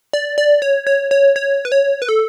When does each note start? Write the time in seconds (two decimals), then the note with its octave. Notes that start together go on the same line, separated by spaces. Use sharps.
0.13 D5
0.38 D5
0.62 C#5
0.87 C#5
1.11 C#5
1.36 C#5
1.65 B4
1.72 C#5
2.02 B4
2.09 A4